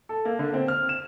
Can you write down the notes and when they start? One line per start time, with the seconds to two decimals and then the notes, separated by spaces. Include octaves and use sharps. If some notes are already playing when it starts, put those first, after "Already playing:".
0.09 A4
0.25 A#3
0.39 D3
0.54 C4
0.68 F6
0.89 E7